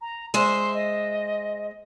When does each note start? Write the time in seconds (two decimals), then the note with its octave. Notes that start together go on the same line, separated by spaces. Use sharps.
0.01 A#5
0.34 G#3 C5 E5 C6
0.74 D#5